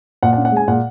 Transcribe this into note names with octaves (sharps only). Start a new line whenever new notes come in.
A#2 F#5
F#5
C#4
F#5
G#3 G#5
A#2 F#5